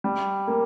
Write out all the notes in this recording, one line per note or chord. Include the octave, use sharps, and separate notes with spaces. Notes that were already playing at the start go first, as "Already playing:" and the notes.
G3
A#3